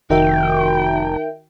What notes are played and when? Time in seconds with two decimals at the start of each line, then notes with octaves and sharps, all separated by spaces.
0.10 F1 D#3 D#4 F#4 A#4 E5 G5